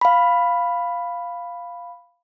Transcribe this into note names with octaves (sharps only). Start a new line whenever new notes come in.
F5 B5